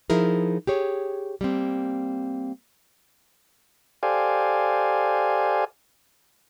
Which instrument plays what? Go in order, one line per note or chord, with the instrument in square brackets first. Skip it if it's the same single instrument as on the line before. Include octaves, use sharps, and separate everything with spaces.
[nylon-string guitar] F3 D#4 E4 G#4 A#4
G4 G#4 C#5
G3 A#3 C4
[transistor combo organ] G4 A4 C5 D5 F5 G#5